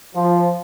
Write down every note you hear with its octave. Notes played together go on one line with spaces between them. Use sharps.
F3